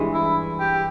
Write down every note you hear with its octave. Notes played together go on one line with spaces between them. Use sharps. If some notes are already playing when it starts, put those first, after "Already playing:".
Already playing: G2 E3 G#3
E4
G4